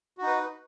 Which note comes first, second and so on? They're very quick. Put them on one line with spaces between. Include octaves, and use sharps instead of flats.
F#4 D#4 B4